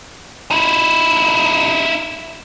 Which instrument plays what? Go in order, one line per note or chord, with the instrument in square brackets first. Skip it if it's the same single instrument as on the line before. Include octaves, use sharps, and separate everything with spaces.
[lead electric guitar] D#4 E4